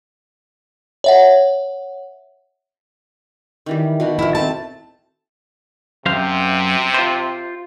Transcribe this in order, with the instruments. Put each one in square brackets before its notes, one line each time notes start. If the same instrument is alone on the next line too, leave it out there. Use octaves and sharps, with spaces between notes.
[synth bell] C#5 E5 F#5
[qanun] D#3 E3 G3
B2 D#3 F#4
[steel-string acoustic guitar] F3 E4
[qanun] A3 C4 [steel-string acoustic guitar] A5
[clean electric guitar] F#2 C5 F5 [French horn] C3
[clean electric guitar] F4 C5